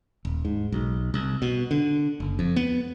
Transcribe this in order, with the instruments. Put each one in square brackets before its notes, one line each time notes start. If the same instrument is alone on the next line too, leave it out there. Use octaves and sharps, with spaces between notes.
[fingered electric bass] D#1
G#2
B1
C2
B2
D3
F#1
F2
B3